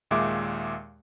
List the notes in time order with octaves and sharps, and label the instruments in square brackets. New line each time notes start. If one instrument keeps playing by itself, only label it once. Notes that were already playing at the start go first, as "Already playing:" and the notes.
[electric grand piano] D#2 A#2 G#3 E5 D6